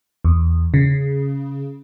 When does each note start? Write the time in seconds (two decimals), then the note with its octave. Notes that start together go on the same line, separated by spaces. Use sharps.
0.25 E2
0.74 C#3